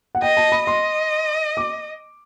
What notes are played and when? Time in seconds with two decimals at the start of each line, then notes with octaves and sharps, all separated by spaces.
0.15 F#5
0.22 D#5 G5
0.37 A5
0.52 B5
0.67 D#5 C6
1.57 D6